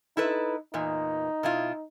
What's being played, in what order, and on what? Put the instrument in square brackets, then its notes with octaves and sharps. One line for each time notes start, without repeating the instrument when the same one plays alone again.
[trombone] D#4 [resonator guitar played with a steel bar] E4 A4 B4
[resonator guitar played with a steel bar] E2 A#2 [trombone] D#4
[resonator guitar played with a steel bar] B2 E4 F4